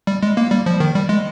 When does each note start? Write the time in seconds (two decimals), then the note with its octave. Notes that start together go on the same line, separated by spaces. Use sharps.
0.07 G3
0.23 G#3
0.37 A#3
0.51 G3
0.66 F3
0.80 D#3
0.95 G3
1.09 G#3